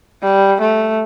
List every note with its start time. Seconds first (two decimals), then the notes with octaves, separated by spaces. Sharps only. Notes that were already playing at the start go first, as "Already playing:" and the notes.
0.22 G3
0.60 A3